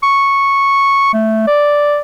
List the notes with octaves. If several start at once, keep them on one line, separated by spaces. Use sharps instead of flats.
C#6
A3
D5